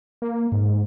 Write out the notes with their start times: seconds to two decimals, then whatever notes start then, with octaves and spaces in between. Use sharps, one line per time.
0.22 A#3
0.52 G#2